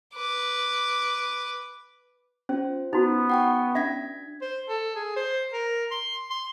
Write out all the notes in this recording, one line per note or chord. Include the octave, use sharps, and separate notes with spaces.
B4 D6
C#4 F4 C5
B3 D#4 E4 F#4
F#5 G5 C#6
C#4 D4 E5 G#6 B6
C5
A4
G#4
C5
A#4
C6
C6